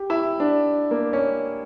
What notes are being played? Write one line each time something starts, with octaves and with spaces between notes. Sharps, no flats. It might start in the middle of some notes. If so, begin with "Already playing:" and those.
Already playing: G4
E4
D4
A#3
C#4